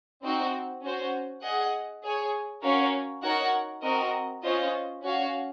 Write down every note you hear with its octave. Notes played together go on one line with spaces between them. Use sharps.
C4 D#4 F#4 C5
C#4 F#4 C5
G#4 D#5 F#5
G#4 C#5 G#5
C#4 F#4 A#4 C#5 F5
D#4 F#4 A#4 C#5 F#5
C4 F#4 A#4 D#5
C#4 F4 C5 D#5
C#4 F#4 C#5 F5